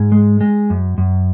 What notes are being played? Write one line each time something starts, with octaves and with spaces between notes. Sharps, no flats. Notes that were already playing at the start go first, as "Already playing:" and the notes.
Already playing: G#2 G#4
G#3
G#3
F#2
F#2